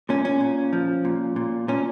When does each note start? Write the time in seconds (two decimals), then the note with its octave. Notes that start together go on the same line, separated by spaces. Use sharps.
0.09 A#2 C#4
0.25 C#4
0.40 A#2
0.73 F3
1.05 A#2
1.36 A#2
1.68 A#2 C#4